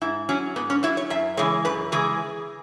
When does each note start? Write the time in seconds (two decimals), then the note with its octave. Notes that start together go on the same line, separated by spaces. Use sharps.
0.01 G#2 E4
0.29 F#3 C#4
0.56 G#2 B3
0.70 C#4
0.83 F#3 E4
0.97 C#5
1.10 F#2 E5
1.37 C#3 E3 G#3 C#5
1.65 F#2 B4
1.92 C#3 E3 G#3 G#4